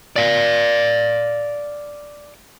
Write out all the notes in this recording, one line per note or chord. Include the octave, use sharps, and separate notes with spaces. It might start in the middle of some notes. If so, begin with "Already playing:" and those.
D5 F5